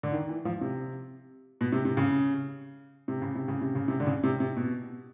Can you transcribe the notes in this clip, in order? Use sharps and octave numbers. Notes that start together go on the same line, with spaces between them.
D3
D#3
E3
F3
C3
B2
C3
C3
C#3
C3
C#3
C3
C#3
C3
C#3
C3
D3
C#3
C3
C3
B2